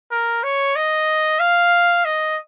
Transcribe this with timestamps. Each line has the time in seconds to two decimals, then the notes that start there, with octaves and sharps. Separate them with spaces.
0.11 A#4
0.43 C#5
0.76 D#5
1.40 F5
2.05 D#5